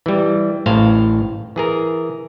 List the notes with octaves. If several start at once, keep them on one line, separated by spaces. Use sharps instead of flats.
E3 G3
A1 A2 C5 F5
E3 G#4 A#4